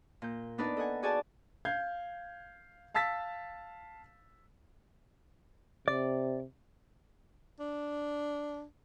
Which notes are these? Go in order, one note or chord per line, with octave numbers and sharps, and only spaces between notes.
A#2 G6
B3 D4 D#4 B4 D5
A4 D#5 F#5 G#5
F#4 G#4 D5 F#5 G#5 A5
F5 G6 G#6 C7
F5 A5 E6 A6 B6
C3 D5
D4